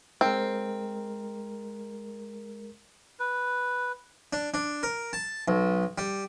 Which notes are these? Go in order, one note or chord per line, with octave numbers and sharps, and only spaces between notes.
G#3 C4 A#4
B4
D4
D4
A#4
A5
B1
G3